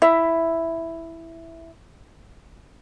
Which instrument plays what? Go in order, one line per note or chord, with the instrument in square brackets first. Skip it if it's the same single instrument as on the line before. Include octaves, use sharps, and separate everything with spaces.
[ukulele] E4 E5